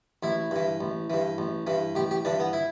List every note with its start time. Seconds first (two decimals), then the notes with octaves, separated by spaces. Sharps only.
0.23 A1 E4
0.51 G2 E3
0.81 A1
1.10 G2 E3
1.38 A1
1.67 G2 E3
1.95 A1 G4
2.11 G4
2.25 G2 E3 D4
2.40 B3
2.53 E4